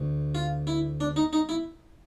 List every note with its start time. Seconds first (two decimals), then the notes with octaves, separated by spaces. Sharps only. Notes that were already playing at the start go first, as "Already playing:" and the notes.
Already playing: D2
0.35 F4
0.67 E4
1.01 D4
1.16 D#4
1.33 D#4
1.49 E4